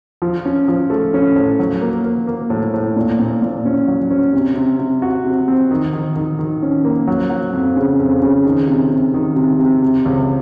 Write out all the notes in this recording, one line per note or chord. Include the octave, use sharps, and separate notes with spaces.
F3
C#4
F3
A3
C#4
A2
F#3
A#3
A#3
A#3
A2
A2
A#2
A#2
A#2
C#4
F#3
C#4
C3
C3
C3
F#4
C3
C4
D#3
D#3
D#3
D#3
C#4
A#3
F#3
F#3
F2
C#3
F2
C#3
D#3
C3
C3
D#3
C3
C3
C3
C#2